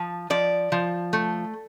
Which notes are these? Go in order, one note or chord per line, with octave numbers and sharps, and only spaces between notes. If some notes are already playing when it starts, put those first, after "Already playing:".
Already playing: F3
F3 D5
F3
A3